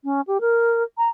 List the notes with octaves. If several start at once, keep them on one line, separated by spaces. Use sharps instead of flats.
C#4
G4
A#4
A#5